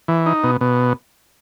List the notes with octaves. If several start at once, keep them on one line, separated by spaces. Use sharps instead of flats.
E3
D#4
B2
B2